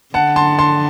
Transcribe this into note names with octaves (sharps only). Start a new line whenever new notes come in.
D3 F#5 A5
A5 C6
A5 C6